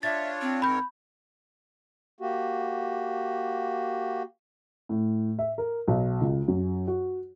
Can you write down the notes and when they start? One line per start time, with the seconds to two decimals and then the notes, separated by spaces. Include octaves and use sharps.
0.03 D4 F4 C#5 E5 A6
0.41 C4
0.62 G#2 A#4 C#5 B5 G6
2.20 A#3 F#4 G4
4.89 A2
5.39 E5
5.58 A#4
5.88 B1
6.21 C#2
6.48 F#2
6.88 F#4